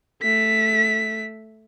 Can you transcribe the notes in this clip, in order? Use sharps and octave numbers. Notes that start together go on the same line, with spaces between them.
A3 B6